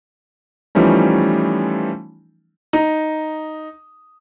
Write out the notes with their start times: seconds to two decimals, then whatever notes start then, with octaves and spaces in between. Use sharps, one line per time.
0.75 E3 F3 G3 A3 C#4 D#4
2.73 D#4